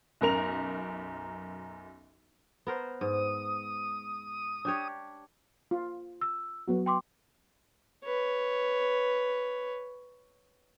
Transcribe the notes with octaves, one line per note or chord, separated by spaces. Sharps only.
B1 F#2 A#4 F7
B3 A#4 C5
G#2 D#6
D4 G4 C#5
F4
E6
F#3 B3 F#4
G5 C6 D6
B4 C#5